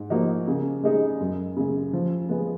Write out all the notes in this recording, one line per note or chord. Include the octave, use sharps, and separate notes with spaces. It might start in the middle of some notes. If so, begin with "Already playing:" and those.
Already playing: G#2
F3 A#3 D#4 F#4
C#3
G#3 D#4 G#4
F#2
C#3 G#3
F3
G#3 B3